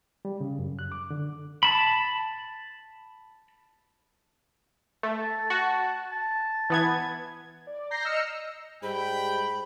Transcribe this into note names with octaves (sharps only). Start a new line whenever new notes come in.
G3
C#3
F#2
F#6
D6
D3
A5 B5
A3
A5
F#4 A5
A5
E3 B3 G#6
D5
A#5 G6 A#6 C7
D#5 E6 F6 C#7
G#2 G3 G5 B5